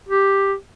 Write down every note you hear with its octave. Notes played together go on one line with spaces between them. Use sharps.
G4